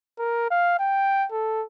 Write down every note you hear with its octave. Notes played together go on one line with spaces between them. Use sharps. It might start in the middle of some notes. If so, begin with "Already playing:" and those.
A#4
F5
G5
A4